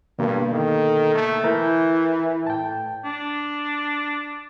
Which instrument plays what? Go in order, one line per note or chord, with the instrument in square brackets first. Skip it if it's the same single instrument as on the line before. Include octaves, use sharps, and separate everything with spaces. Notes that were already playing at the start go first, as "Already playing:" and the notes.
[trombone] G2 [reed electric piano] B2 D3 A#3
[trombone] D#3 [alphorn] A4
[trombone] A3
[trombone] E3 [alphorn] E4 [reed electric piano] A#4 E5 G6
[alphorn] E4
[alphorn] A2 [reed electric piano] G5 A5
[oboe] D4